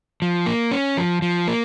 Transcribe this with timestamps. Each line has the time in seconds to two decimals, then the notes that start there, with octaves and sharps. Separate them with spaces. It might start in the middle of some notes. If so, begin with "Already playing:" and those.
0.22 F3
0.46 A#3
0.71 C#4
0.97 F3
1.22 F3
1.48 A#3